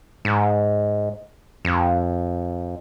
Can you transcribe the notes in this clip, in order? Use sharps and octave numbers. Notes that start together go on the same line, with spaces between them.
G#2
F2